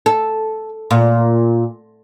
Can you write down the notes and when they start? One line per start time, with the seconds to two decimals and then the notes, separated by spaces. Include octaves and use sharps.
0.06 A4
0.91 A#2